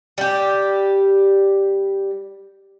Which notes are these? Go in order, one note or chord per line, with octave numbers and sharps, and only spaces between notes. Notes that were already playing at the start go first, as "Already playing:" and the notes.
G3 G4